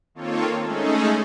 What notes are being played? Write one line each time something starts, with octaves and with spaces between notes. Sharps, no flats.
D#3 A#3 C4 F4 A4 C#5
G#3 A3 C#4 D#4 G#4 A4